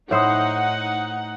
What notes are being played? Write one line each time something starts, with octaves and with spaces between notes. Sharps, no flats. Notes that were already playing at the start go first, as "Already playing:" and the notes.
A2 D#4 E4 C5 C#5 F#5 D#6